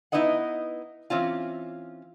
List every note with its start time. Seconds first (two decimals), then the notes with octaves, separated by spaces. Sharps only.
0.12 B3 D#4 E4 B4 D#5 F#5
1.10 E3 C4 C#4 F4